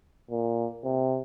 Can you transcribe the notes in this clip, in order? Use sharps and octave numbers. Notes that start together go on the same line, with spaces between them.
A#2
C3